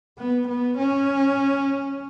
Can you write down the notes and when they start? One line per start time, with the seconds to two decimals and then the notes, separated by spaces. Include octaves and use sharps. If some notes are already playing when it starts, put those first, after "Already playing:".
0.19 B3
0.49 B3
0.78 C#4